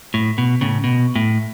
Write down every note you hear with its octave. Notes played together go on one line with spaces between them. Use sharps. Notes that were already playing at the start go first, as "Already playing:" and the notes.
A2
B2
A2 C#3
B2
A2